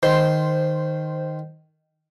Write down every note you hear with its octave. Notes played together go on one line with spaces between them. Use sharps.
D#3 C5